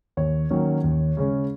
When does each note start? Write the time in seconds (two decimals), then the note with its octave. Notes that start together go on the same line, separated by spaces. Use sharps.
0.17 D#2 C#5
0.50 D#3 F#3 A#3 C#4
0.84 D#2
1.17 C#3 G#3 C#4